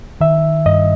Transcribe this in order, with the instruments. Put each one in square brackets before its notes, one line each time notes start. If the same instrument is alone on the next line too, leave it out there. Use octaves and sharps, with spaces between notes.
[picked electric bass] D#3 [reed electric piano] E5
[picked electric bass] G2 [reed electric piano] D#5